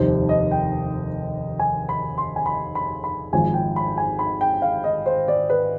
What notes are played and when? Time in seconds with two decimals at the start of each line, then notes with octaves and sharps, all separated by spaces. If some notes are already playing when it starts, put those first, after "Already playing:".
Already playing: F1 D#2 D#3 G3 C5
0.29 D#5
0.51 G5
1.59 G#5
1.89 B5
2.18 C6
2.36 G#5
2.46 B5
2.75 B5
3.04 B5
3.33 G#1 G#2 F3 G#5
3.54 G5
3.76 B5
3.97 G#5
4.19 B5
4.41 G5
4.62 F5
4.84 D#5
5.06 C5
5.28 D5
5.50 B4